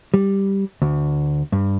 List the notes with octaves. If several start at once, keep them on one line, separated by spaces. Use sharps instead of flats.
G3
D2
G2